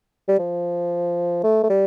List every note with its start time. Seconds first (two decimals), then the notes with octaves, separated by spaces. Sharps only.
0.28 G3
0.39 F3
1.44 A3
1.63 A3
1.70 G3